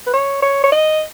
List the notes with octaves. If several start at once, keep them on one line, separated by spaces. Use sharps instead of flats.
B4
C#5
C#5
C#5
D#5